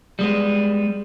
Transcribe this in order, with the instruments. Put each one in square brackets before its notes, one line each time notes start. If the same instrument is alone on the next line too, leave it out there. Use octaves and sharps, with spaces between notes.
[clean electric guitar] G3 G#3 B3